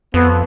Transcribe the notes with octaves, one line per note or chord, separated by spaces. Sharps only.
F2 B3